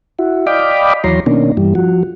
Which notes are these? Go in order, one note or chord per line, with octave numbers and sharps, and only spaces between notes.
E4 F#4
D5 D#5 F5 G5 B5 D6
D#2 E3 F#3 C#5 A#5 C6
B2 D#3 A#3 C#4 D4
G2 E3 G3
F3 F#4